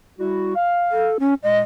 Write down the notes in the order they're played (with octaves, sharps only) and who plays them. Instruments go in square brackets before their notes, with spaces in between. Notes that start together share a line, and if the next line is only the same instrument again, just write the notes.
[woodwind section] G3 E4 F#4
F5
[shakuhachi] A4
C#4
[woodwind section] A#2 G#3 [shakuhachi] D#5